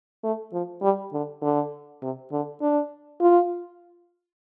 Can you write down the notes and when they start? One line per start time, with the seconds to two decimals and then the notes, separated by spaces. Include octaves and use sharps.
0.24 A3
0.53 F3
0.83 G3
1.13 D3
1.42 D3
2.02 C3
2.32 D3
2.62 D4
3.21 F4